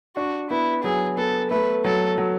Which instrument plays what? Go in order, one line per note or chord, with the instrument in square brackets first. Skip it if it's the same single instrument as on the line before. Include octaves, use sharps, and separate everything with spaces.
[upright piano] D4 [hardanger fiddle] F#4
[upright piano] B3 [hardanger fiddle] E4
[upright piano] F#3 [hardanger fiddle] G#4
[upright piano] B3 [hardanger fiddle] A4
[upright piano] A3 [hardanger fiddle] B4
[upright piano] F#3 [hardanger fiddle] A4
[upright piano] F#3